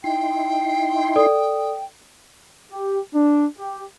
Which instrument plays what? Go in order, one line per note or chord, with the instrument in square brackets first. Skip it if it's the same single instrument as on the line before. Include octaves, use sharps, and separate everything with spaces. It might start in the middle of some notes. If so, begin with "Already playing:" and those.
[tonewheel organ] D#4 E4 C6 [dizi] G5
[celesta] A4 D5 D#6
[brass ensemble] G4
D4
G4